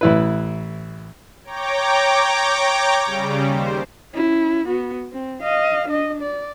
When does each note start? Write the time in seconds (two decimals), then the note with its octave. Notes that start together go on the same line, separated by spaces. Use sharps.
0.01 A1 E4 B4
1.44 C#5 G5 A#5 D6
3.05 C#3 G3
3.46 D#2 C5
4.13 C#4 E4
4.66 B3 F#4
5.13 C4
5.42 D#5 F5
5.89 D4 D#5
6.22 D5